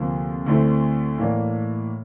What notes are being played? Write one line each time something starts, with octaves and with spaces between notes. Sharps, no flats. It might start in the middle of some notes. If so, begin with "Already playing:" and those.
Already playing: D2 C3 F3 A#3
D2 D3 A3 C4 E4
A2 E3 A#3 D4